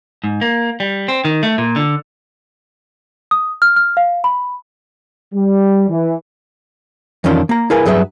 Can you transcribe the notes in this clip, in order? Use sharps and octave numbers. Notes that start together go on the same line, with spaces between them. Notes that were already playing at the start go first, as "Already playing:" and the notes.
G#2
A#3
G3
C4
D#3
A3
A#2
D3
D#6
F6
F6
F5
B5
G3
E3
F2 D#3 E3 C#4 D4 F4
A#3 A#5
E4 G#4 A#4 B4 F5 G#5
G2 F#3 G#4 B4 E5